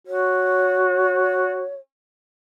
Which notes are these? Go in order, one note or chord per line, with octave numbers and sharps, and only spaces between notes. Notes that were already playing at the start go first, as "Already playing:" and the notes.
F#4 C#5